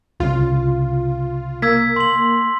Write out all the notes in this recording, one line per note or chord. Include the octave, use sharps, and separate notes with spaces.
C2 C#3 F4
A#3 E6 G#6 B6
C6 F#7